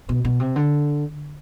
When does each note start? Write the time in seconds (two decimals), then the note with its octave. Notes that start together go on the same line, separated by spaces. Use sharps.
0.09 B2
0.25 B2
0.40 C3
0.56 D3